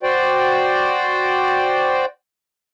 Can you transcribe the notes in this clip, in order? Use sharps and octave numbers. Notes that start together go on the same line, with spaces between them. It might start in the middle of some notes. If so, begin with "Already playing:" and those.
F#4 C5 D5 G5